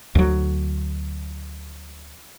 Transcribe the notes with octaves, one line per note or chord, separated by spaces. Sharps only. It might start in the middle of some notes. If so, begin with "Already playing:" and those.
D2 F#3